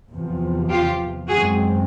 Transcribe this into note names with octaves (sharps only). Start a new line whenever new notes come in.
E2 C3 F3
F4 G4
F#2 D#3 G#3 C4 F#4 G#4